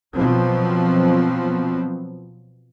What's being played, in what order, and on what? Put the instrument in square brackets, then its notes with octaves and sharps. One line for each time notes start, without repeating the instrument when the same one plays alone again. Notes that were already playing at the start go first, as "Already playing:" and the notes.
[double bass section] B2 F3 F#3 B3 C4